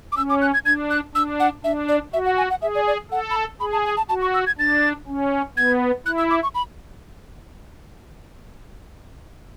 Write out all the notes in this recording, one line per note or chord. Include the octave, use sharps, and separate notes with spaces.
D6
C#4 E6
D6
F#6
G#6
D4 G#6
F#6
D4 E6
F#5
D4 E5
D5
F#4 E5
F#5
G#5
F#5
G#4 E5
D5
D5
A4 F#5
B5
A5
G#4 B5
A5
G#5
A5
F#4 A5
C#6
E6
G#6
D4 A6
C#4
B3 G#6
E4 F#6
E6
D6
C#6
B5